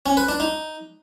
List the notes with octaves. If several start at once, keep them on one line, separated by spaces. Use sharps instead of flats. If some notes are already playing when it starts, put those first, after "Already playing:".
C#4
B4
D4
D#4